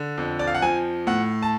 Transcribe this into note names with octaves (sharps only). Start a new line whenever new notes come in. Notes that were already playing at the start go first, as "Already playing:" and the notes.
Already playing: D3
F2
D5
F5
F#5
F3 G#5
A2 F#5
A5